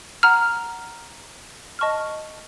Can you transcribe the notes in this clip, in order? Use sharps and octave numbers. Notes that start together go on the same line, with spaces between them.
F#5 A#5 F6
D#5 A5 C#6 F6